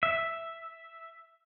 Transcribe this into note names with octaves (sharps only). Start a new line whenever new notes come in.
E5